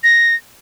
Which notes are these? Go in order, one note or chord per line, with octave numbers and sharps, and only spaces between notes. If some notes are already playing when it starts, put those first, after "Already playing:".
A#6